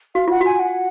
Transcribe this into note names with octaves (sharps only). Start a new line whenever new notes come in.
F#4 F5
F4 F#5
F#4 G#5
F#5